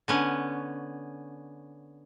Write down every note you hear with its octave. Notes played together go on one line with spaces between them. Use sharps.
D3 B3 C#4